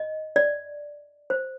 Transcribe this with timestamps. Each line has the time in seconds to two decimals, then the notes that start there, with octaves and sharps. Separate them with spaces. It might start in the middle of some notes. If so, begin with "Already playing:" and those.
Already playing: D#5
0.36 D5
1.30 C5